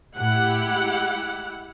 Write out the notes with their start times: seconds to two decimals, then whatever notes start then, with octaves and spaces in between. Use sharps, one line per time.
0.16 A2 E4 G4 F#5
0.63 G#3